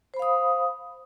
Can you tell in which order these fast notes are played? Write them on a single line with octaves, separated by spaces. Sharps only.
C5 B5 F5 D#6